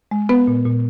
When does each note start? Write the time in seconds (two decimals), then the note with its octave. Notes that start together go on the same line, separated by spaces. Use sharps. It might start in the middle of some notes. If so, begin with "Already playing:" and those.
0.11 G#3
0.29 B3 B4
0.47 A#2
0.66 A#2